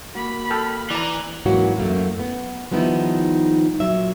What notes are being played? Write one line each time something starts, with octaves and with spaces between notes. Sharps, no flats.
A#3 F#4 B5
A4 G5 F6
E3 D5 A#5
G#2 E3 F#3 A#3 C#4 F#4
F#2 A3 A#3
B3
D#3 F3 G3 B3 D#4 E4
A#2 F#3 E5